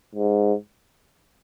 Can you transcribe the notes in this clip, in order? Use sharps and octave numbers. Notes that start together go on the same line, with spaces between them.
G#2